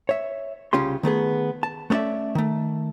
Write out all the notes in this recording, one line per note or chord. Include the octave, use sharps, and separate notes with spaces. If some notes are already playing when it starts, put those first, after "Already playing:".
C#5 E5
C2 C#3 C#4 F4 G4 C6
D#3 A3 B3 G#4
A5
A3 B3 C#4 D5 E5
D#3 A3